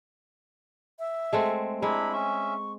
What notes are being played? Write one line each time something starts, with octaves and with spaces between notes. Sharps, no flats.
E5
G#3 A3 C4
G#3 D4 E4 A#5 B5
C#4 E5 C#6